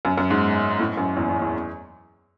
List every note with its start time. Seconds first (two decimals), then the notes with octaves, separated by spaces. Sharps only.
0.05 F#2
0.17 F#2
0.30 G#2
0.79 A2
0.97 F#2
1.17 E2
1.29 E2
1.42 E2